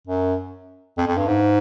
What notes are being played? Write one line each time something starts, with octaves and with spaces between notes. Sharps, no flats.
F#2
F2
F2
G2
G#2